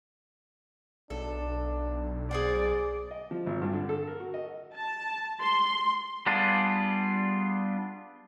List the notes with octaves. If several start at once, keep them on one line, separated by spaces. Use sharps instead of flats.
B1 D4 A4
G#4 C5 D5 F#5
D#5
F3
G#1
G2
D3
A4
A#4
F#4
D#5
A5
C6
G3 B3 D4 F4 G#4